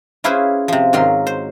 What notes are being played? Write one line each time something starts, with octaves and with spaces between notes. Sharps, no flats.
C#4 E4 F4 G#4 B4 C5
C3 F3
G#2 D#3 F#3 F4 C6
C5